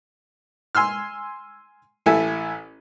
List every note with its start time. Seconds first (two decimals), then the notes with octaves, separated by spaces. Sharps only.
0.75 G#5 C6 E6 F6
2.06 A1 E4 A4 E5 G#5